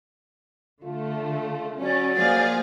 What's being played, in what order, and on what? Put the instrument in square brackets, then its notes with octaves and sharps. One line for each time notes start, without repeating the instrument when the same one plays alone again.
[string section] D3 A3 [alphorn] F4
[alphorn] F#3 [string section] C#4 [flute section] D5
[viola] F3 A#3 [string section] G#4 F5